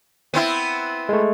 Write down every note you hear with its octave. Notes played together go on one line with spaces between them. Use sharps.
B3 C4 E4
G#3 A3